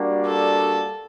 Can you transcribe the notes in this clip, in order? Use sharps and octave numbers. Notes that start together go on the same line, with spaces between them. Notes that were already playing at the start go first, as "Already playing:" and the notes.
Already playing: G3 A#3 D4 F#4
A4